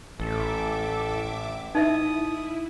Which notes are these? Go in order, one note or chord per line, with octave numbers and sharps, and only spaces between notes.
A1 A2 A4 E5 D6
D#4 E4 D#5 E5 D#6